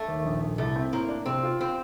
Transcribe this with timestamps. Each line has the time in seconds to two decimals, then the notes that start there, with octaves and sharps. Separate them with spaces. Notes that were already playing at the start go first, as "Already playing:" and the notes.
Already playing: A3
0.08 D#2
0.25 A#1
0.42 A#1
0.58 C2 A3
0.76 C4
0.93 A2 A#3
1.09 D4
1.26 C3 C4
1.43 F4
1.61 C4